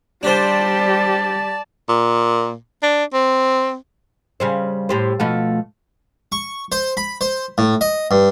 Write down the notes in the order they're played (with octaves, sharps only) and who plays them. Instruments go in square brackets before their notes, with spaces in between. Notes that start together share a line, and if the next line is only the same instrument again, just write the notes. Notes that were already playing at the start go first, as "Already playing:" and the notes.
[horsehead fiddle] G3 G4 [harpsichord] D4 C5 [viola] D5 A5
[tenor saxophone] A#2
D4
C4
[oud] C#3 G3 C5
A2 G4 C5
B2 F3 A3
[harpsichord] C#6
C5
B5
C5
A2
D#5
G2